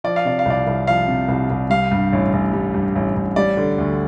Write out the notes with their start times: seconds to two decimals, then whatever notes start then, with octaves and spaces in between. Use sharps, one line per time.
0.04 F3 D5
0.16 F5
0.25 C3 D5
0.39 F5
0.45 C2 D5
0.67 C2
0.87 F3 F5
1.08 C3
1.28 C2
1.50 C2
1.70 G3 F5
1.91 G2
2.13 A1
2.33 A1
2.53 G3
2.74 G2
2.96 A1
3.16 A1
3.36 G3 D5
3.57 D3
3.78 D2